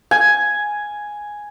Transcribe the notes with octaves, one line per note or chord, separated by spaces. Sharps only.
G#5